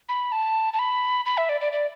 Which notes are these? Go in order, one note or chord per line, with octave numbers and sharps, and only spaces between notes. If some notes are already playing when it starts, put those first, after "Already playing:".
B5
A5
A5
B5
B5
E5
D5
D5
D5